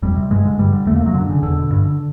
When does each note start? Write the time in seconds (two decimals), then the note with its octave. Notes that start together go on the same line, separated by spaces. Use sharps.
0.02 F2 G3
0.16 C3
0.30 G2 G#3
0.45 D3
0.59 G2 G3
0.72 D3
0.86 E2 A3
0.95 A#3
1.00 C3
1.06 F#3
1.14 F#2 D3
1.29 C#3
1.42 E2 D3
1.56 B2
1.70 G2
1.85 D3